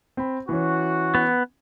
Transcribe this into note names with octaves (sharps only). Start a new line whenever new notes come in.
C4 B5
E3 C#4 F#4
B3